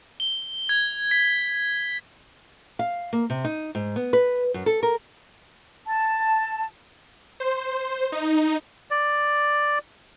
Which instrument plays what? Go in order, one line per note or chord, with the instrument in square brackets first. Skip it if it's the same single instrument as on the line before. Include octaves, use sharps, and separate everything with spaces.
[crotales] G7
G#6
B6
[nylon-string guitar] F5
A#3
C3
D#4
G#2
B3
B4
F#2
A4
A#4
[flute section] A5
[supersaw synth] C5
D#4
[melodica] D5